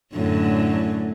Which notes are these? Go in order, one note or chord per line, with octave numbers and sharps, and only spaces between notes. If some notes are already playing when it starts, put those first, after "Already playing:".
F#2 A2 D3